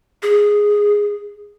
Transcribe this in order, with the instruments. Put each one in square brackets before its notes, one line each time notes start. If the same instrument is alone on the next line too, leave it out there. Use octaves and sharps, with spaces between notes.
[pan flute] G#4